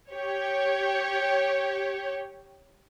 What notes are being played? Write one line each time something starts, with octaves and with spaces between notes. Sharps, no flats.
G4 C#5